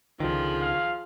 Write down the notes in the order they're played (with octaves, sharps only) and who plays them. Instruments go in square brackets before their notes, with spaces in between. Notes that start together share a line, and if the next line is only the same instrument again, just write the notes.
[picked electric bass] C#2 D3 D#3 [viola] F3 G#4
[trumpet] F5